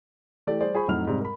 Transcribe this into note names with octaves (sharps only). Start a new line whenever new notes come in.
E3 A3 G4 D5
G3 G#4 C5 D5
F4 G#4 C5 G#5 B5 C#6
F2 A2 F#3 D#4 F6 F7
G#2 C3 G3 C4
A#4 B5